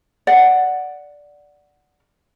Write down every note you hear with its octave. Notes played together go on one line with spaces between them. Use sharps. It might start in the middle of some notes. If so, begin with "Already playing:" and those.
D5 F#5